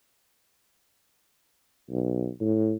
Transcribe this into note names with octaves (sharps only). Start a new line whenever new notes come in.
B1
A2